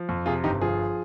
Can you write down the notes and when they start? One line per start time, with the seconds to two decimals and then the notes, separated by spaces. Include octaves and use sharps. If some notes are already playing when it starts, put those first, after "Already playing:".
Already playing: F3
0.09 F2
0.26 C3 F4 G#4
0.44 G1 D#4 G4
0.61 F3 F4 G#4